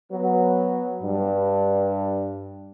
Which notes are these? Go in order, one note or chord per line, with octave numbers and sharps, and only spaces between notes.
F#3 B3
G2